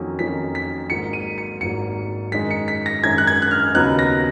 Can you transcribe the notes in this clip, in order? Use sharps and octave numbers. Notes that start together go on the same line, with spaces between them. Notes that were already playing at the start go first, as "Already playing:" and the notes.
Already playing: F2 D#3 F#3 A#3 C#4
F2 D#3 F#3 A#3 C#4 B6
B6
G#1 G#2 F#3 A#3 C#7
D#7
C#7
G#1 G#2 F#3 A#3 C#7
F#2 D#3 G#3 D#4 B6
C#7
B6
A#6
F#2 D#3 G#3 D#4 G#6
F#6
G#6
F#6
F6
D#2 C#3 F#3 B3 D#4 F#6
A#6